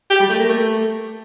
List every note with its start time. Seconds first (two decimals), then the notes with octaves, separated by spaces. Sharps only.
0.10 G4
0.20 G3
0.29 A3
0.39 A#3
0.49 A3